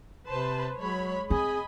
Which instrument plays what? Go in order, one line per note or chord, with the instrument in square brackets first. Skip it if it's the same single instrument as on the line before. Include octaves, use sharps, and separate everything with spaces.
[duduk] C3 [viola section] B4 C5 A5
[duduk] F#3 [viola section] G#3 C#5 B5
[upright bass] C4 [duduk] G#4 [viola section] D#5 G#5 B5